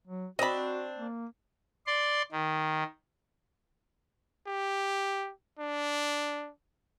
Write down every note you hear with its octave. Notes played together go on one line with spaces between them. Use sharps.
F#3
C4 D4 F#4 D#5 B5
A#3
D5 C6
D#3
G4
D4